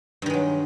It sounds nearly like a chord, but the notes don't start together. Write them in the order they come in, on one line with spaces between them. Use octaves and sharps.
G2 D#3 G#3 F#3